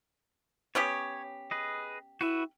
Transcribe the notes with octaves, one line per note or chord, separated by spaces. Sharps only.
B3 C#4 G4 C#5
G#4 B4 D#5
E4 F#4 B4 E5